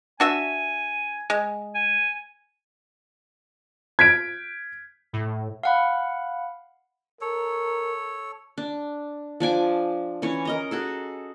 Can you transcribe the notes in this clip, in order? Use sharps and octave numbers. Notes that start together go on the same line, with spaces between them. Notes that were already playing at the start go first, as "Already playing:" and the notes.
D4 F#4 E5 G#5
G#3
G#5
G#6 B6 D7
A2
F5 F#5 B5
A4 A#4 C#5
D4
F3 D4 G#5 D6
E3 C#4 C#5
A#4 D#5 A#5
F#4 G#4 A4